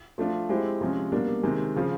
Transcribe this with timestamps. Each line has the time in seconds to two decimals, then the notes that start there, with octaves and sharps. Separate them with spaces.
0.18 F3 A3 D4 F4
0.49 G#3 C4 E4 G4
0.81 C3 F3 G#3 C#4
1.12 B2 G3 A#3 D4
1.43 C3 D#3 G#3
1.76 C#3 F3